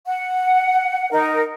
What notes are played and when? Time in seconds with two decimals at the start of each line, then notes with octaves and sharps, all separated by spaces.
0.06 F#5
1.11 D#4 A#4